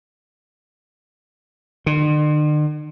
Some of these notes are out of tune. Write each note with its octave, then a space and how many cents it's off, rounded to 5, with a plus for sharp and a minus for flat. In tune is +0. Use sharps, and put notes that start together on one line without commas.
D3 +45